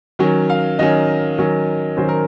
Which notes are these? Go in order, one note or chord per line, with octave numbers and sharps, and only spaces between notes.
D#3 F#3 C#4
F5
D#3 F#3 C#4 D#5
D#3 F#3 C#4
D#3 F#3 C#4 C5
A#4